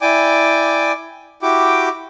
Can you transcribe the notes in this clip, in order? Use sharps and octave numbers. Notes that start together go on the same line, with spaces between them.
E4 D5 G5 G#5 D6
E4 F#4 G4 G5 D6